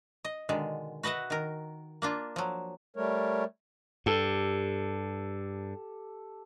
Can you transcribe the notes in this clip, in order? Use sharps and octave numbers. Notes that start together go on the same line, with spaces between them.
D#5
B2 D3 D#3 G#3
F#4 B4 D#5 E5 F#5
D#3 A#4
A#3 D4 F4
F3 F#3
G3 A3 A#4 C#5
G2 G4 A4 G5